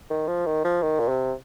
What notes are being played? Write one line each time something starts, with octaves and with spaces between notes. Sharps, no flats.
D#3
F3
D#3
F3
D#3
A#2
C3